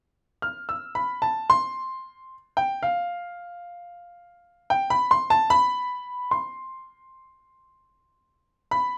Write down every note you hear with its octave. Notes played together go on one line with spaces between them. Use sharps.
F6
E6
B5
A5
C6
G5
F5
G5
B5
C6
A5
B5
C6
B5